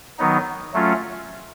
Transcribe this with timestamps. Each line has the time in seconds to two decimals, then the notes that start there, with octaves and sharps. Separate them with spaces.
0.19 D#3 F#3 B3 D#4
0.74 F#3 A3 C#4 F4